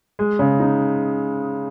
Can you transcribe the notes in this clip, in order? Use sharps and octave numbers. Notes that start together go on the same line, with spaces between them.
G#3
C#3
D#4